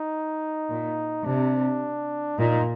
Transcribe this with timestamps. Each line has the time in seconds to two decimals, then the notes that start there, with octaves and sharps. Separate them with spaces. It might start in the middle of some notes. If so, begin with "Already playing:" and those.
Already playing: D#4
0.69 A#2
1.25 C3 D4
2.38 A#2 D#4